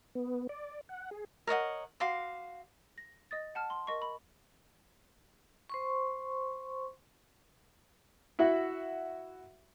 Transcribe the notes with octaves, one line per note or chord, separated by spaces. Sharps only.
B3
D5
F#5
G#4
A#4 C#5 D#5 F#5
F#4 F5 C6 D6
A#6
D#5 D#6 A6
F#5 A5 F6
C6
A#4 D#5 C#6
B5
C5 C6 C#6
E4 F#4 E5 F#5